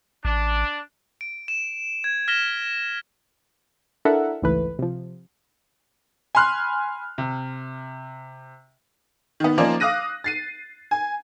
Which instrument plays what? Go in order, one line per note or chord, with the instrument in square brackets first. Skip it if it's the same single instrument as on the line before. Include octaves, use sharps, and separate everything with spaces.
[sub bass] A1 [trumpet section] D4
[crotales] D7
E7
G#6
F6 A#6 B6 E7 G7
[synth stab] D4 E4 A4 A#4 E5 F#5
G#1 C#2 G#2 E3 A3 B4
C3 F3
[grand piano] G#5 B5 C6 F6 F#6
C3
[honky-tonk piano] D#3 B3
F3 A#3 C#4 D#4 C5 D5
F5 D6 D#6 F#6 A#6 D#7
A6 C7 D#7
G#5